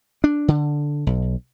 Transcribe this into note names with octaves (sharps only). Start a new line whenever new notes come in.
D4
D3
B1